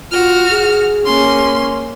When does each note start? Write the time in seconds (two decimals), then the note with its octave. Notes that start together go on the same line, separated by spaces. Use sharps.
0.11 F4 F#4 F6
0.51 G#4
1.06 A#3 C#4 C6